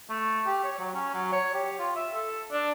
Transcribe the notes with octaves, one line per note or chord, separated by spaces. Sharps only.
A3
G4
C#5
F#3
C#4
F#3
C#5
G4
F4
E5
A4
D4